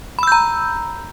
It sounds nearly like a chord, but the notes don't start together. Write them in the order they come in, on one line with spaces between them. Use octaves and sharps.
B5 E6 G6 A#5